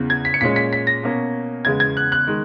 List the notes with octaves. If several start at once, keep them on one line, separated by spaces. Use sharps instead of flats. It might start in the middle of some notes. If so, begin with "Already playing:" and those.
Already playing: E2 C#3 E3
G#6
B6
C#7
A#2 G#3 C#4 B6
B6
B6
A#6
B2 A#3 C#4
E2 C#3 G#3 B3 G#6
G#6
F#6
F#6
D#3 G#3